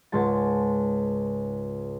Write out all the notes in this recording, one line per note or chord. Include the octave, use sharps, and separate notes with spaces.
C#2 G#2 G#3 A5